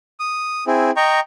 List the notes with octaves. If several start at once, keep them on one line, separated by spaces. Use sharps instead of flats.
D#6
C4 E4 G#4
D#5 G5 A#5 C#6